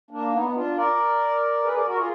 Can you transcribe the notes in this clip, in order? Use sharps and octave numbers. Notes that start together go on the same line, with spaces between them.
A#3 D4
B3 D#4
D#4
D4 F4
A#4 D5
G#4 B4
A#4 D5
F#4 A#4
F4 G#4